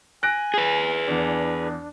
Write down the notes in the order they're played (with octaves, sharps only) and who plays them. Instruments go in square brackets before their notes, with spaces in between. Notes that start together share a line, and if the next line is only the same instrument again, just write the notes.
[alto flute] G#5 [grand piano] F#6 A#6 D7
[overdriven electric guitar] G#4 B4
[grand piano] E2 [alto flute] D4